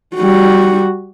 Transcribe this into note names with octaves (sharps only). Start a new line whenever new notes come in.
G3 F#4